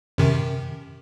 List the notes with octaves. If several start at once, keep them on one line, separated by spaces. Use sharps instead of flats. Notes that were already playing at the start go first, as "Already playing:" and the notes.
F#2 C3 D#3